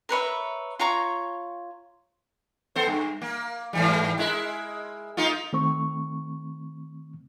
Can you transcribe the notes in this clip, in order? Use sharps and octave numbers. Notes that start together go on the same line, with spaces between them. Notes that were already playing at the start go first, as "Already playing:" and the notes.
A#4 B4 C#5 E5
F4 C#5 A#5 C#6
B3 A4 C5
G2
A#3
G#2 E3 G3
G#3 E4 A#4
A#3 D#4 F4
D#3 A3 C4 C#6